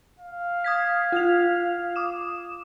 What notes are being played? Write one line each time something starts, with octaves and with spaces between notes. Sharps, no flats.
F5
D#6 G#6 B6
F4 G#6 F7
D6 D#6 E7